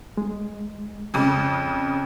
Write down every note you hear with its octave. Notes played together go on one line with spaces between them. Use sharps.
G#3
F2 C#3